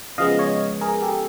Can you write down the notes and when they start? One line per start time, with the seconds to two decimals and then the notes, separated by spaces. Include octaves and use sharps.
0.18 C#3 F3 G#3 B3 D#5 F5
0.39 C#5 D#5
0.81 G#4 A#4
1.02 G4 A4